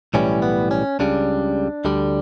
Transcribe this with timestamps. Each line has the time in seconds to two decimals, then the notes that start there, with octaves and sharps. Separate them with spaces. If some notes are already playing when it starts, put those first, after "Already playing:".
0.14 B1 A2 E3 G3 C#4
0.42 B3
0.71 C#4
0.99 C#2 C#3 G3 D4
1.85 D2 D3 G3